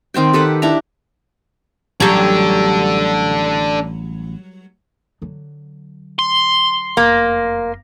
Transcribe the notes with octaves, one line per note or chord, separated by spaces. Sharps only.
D#3 C4 C5 G5
G4 A4 B4 F#5
D4 E4 D5 A#5
A1 F#3 G3 D4 A4
D3 F#3
C6
F1 F#2 A#3